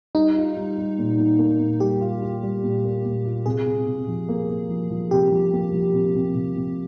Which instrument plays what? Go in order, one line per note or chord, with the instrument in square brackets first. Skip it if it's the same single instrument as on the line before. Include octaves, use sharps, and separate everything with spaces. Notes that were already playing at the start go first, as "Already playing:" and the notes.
[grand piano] G3 [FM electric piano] D#4
[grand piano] F4
G3
G3
A#2
A#2
A#3
A#2
[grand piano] G3 [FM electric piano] G4
[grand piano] F4
F4
G3
A#2
A#3
A#2
F4
[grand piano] C3 [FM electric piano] G#4
[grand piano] C3
C3
F3
A#3
A#3
F3
F3
[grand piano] C3 [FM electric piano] G4
[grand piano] F3
A#3
F3
C3
C3
C3
C3